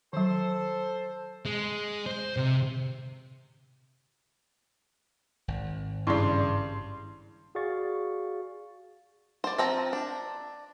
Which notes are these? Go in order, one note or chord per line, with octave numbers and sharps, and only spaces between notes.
D#3 F#3 A4 C5
G#3
C5
C3
G#1
G2 C#3 E4 D5 C6
F#4 G#4 D5 F5 C#6 A6
C5 D5
F3 C4 A#5
D4